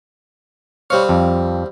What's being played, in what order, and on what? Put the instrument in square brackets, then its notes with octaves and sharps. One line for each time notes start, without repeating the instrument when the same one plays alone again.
[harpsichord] G3 C4 F5 [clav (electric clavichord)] C#5
[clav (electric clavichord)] F2